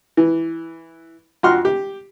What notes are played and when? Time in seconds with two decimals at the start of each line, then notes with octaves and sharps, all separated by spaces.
0.17 E3
1.43 F2 F#4 C6 F6
1.65 G4